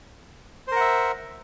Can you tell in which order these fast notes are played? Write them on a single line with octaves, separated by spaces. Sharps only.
C5 A#4 F#5 E5